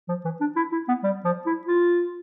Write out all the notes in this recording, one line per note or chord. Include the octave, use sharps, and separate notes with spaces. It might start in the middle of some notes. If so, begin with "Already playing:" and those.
F3
E3
D4
E4
E4
B3
G3
F3
E4
F4